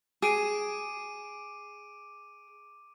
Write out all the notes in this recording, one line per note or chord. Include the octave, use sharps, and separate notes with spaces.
G#4 D6 D7 D#7